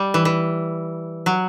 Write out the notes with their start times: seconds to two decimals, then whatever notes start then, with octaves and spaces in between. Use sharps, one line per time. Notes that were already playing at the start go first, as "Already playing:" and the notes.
Already playing: G3
0.14 E3
0.25 E3
1.26 F#3